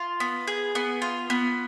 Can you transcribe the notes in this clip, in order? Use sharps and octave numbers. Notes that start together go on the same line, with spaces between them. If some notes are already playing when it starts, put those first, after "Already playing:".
Already playing: F4
B3
G#4
B3
F4
B3